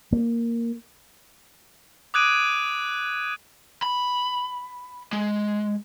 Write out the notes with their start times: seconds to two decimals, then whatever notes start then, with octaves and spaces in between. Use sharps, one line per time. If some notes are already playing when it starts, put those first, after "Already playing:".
0.12 A#3
2.14 D6 D#6 F#6 G#6 D7 D#7
3.82 B5
5.13 G#3